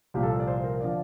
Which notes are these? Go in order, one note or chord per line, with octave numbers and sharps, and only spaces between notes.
C2 A#2 F3 G4
A4
D5
C5
A#4
D3 F3 D5